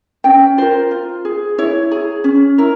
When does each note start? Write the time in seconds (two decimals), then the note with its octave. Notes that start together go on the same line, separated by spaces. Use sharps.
0.24 C#4 G5
0.58 F4 A#4 C5
0.91 F4
1.25 G#4
1.58 E4 C#5
1.92 G#4
2.24 C#4
2.58 E4 A#4